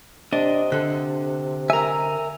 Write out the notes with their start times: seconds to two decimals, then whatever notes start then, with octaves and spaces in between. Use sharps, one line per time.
0.33 C3 D4 D#5
0.72 D3 A4 F#6
1.70 A#4 E5 G#5 A#5